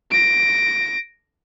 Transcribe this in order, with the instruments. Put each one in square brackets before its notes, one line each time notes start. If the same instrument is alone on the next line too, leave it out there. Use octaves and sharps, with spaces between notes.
[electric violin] A#6 D7